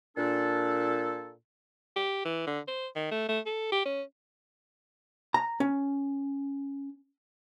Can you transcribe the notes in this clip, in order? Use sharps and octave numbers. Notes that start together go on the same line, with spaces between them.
A#2 D4 A4
G4
E3
D3
C5
D#3
A3
A3
A4
G4
C#4
A#5
C#4